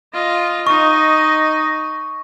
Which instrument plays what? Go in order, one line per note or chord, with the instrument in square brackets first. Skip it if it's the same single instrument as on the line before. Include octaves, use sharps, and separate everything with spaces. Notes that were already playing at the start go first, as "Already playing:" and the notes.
[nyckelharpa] F4 D#5
[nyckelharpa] D#4 D#5 [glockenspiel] C#6